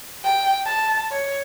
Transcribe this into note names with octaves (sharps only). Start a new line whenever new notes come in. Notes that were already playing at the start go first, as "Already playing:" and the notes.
G5
A5
C#5